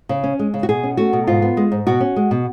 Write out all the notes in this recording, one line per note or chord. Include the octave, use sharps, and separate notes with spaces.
C#3
C#4
G#3
C#3
F#4
B2 G#4
C#4
A3 F#4
B2
G#2 F4
B3
G#3
G#2
B2 F#4
C#4
G#3
B2